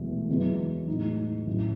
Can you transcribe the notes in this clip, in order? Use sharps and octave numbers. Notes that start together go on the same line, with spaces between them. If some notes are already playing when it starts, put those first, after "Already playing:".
Already playing: E1 E2 B2 A3
F#2 E3 G#3 B3
A2 G#3 D#4
A1 A2 F#3 C#4 E4